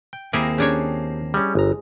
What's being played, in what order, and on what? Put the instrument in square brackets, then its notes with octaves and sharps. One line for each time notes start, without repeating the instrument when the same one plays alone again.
[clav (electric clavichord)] G5
[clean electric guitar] D#2 A#3 C4 [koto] E4 G4 G#4 [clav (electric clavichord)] A#4
[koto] C#4 D4 C#5 [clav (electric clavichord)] G4 G#4 A#5
[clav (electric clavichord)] G3 C#4 [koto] G#3
[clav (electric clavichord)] G1 A#5